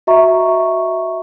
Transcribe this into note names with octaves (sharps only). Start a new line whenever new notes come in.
F#4 D#5 E5 A#5 C#6